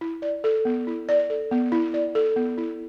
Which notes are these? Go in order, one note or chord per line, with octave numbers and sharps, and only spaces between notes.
E4
D5
A4
B3
E4
D5
A4
B3
E4
D5
A4
B3
E4